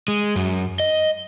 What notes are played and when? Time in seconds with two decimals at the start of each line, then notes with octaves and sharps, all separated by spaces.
0.08 G#3
0.36 F#2
0.80 D#5